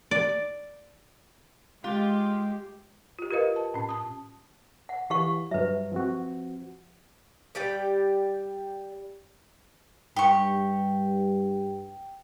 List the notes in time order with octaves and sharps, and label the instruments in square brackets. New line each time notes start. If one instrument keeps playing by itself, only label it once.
[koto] D5
[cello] G#3 [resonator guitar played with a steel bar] F4 [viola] G4
[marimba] F4 G4
F4 A#4 B4 D#5 F5
A5
A2 C#4
A5 D#6
[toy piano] F#5
[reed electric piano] E3 [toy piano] G4 F5 C#6
[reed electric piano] G2 F#3 [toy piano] B4 E5
[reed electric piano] F3 C4 F#4
[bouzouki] G3 G4 D5 G5
[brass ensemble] G2 [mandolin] G4 C#6